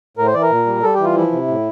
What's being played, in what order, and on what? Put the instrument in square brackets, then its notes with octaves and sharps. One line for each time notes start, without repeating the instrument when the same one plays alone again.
[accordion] A2 A#4
C5
E3 D5
A#4
A#2
G3
G3 A4
E3 G4
F4
F3 E4
C3
A2